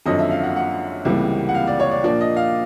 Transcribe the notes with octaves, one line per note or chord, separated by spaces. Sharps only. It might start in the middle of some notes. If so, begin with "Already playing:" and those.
G#1 F#2 D3 F3 D#5
E5
F5
F#5
F#5
C#2 C3 E3 G3 A#3
F#5
F5
D5
C#5
D5
A#2 F3 A#3 D4 D5
D#5
F5